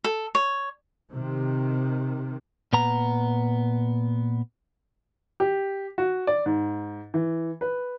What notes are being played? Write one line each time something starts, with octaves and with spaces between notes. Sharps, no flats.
A4
C#5
C3 D#3
A#2 B3 A#5
G4
F#4
D5
G#2
E3
B4